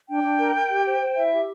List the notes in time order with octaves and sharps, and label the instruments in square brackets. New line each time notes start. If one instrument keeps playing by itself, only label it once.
[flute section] D4 G5
D4
A#4
A#4
G4
C5
C5
E4 E5
G4